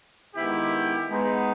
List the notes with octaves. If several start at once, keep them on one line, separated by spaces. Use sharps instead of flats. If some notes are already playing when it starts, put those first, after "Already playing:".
D#3 G#3 B3 E4 G4
G#3 B3 D#4